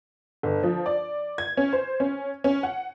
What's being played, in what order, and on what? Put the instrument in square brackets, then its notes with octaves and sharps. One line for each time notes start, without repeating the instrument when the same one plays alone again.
[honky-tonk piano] G1
F3
D5
G#6
C#4
C5
C#4
C#4
F#5